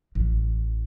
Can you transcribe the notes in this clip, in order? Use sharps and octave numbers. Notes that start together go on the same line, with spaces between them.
A1 E3